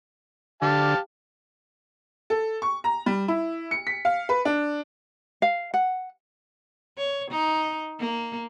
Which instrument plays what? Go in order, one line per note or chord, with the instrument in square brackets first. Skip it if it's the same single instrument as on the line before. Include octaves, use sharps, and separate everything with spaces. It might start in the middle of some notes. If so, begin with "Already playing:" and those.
[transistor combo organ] D3 [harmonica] G4 F5 A5
[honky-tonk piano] A4
C#6
A#5
G3
E4
C#7
B6
F5
B4
D4
[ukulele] F5
F#5
[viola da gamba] C#5
D#4
A#3